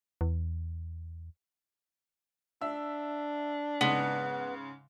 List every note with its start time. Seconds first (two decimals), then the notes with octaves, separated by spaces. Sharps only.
0.21 E2
2.61 D4 E5 E6
3.81 G#2 C#3 G#3 B3